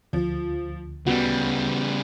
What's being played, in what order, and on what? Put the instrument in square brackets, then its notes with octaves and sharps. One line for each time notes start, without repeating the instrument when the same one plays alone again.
[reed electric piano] D2 [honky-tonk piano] F3
[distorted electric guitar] C#3 G3 [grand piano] B3 [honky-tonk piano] F#4